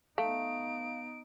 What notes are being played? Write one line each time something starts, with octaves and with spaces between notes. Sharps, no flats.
A3 B3 D#4 F5 D7